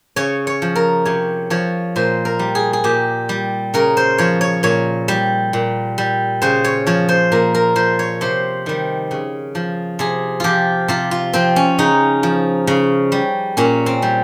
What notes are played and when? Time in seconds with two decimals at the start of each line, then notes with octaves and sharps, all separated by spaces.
0.16 C#3 C#5
0.47 C#5
0.62 F3
0.76 A#4
1.05 C3 C#5
1.50 F3 C#5
1.96 A#2 C5
2.25 A#4
2.39 G3
2.55 G#4
2.73 G#4
2.84 A#2 G4
3.29 G3
3.74 C#3 A#4
3.97 C5
4.18 F3 C#5
4.41 C#5
4.63 A#2 C#5
5.08 G3
5.53 A#2
5.98 G3
6.42 C#3 C5
6.64 C#5
6.87 F3 C#5
7.09 C5
7.32 A#2 A#4
7.54 A#4
7.75 F3 C5
7.99 C#5
8.21 C3 C5
8.66 D#3 G3
9.11 C#3
9.55 F3
9.99 C3 G#4
10.40 F3 F4 G4
10.88 C3 F4
11.11 F4
11.33 F3 C4
11.56 C#4
11.79 C#3 D#4
12.23 F3
12.67 C#3
13.12 G3
13.57 A#2 C#4
13.86 C4
14.02 G3